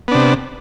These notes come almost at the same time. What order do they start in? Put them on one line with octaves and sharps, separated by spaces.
B3 D4 C3